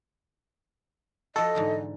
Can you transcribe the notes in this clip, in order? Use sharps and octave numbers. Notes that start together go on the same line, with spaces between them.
F3 F#4 A4 D#5
G#2 D3 E3